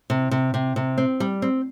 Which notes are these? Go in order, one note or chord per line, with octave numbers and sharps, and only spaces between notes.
C3
C3
C3
C3
C4
G3
C4